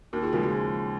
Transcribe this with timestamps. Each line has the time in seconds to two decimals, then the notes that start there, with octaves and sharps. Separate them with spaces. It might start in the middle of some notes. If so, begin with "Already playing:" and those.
0.13 D#2 F#4 A#4
0.22 F4 G#4
0.33 C#3 F3 G#3 F#4 A#4
0.43 F#4 A#4